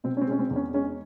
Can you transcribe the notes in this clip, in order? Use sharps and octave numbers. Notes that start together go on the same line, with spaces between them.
B2 C4
C#4
C4
G#3 C#4
C4
E2
C#4
G#3 C#4